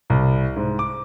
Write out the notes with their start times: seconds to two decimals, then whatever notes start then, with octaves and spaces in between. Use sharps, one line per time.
0.10 C2
0.56 G#2
0.79 D6